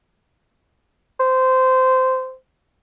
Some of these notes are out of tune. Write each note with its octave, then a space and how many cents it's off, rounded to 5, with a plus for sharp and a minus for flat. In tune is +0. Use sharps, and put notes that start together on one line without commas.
C5 -15